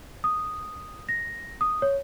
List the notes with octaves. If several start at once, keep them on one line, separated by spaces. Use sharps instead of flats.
D#6
A#6
D#6
C#5